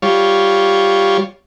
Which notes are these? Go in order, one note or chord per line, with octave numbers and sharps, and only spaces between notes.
G3 F4 C#5